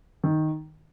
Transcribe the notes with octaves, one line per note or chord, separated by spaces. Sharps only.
D#3